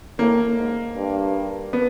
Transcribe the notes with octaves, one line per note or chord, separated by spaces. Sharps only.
A2 A#3
G#2
G2
B3